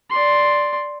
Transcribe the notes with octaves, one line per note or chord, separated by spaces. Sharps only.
D5 C6